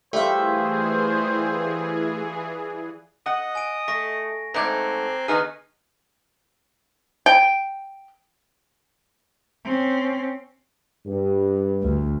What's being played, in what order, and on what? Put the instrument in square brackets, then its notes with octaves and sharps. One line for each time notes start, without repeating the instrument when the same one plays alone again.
[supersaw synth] E3 G#4 [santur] G3 F4 [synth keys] A3 E5 [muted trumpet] C5
[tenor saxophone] D#5 [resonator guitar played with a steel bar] F#5
[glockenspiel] G#5 D7
[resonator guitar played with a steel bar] A3 [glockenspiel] C#6 A#6
[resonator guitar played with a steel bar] G#2 A3 D5 [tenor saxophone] C4 [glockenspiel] A#5 F#6 G#6
[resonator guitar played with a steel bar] D#3 D#4 G#4 [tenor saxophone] B3 [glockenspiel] F6
[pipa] G5
[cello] C4 C#4
[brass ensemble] G2
[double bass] D2